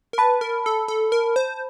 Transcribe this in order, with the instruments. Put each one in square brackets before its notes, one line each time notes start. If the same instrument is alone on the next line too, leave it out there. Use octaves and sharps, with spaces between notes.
[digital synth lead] A#4
[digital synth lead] B4 [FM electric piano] A5 B5
[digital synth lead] A#4
A4
A4
A#4
C5